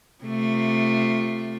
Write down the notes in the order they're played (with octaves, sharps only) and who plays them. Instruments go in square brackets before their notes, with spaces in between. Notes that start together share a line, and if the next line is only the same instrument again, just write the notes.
[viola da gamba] C3 A3 F4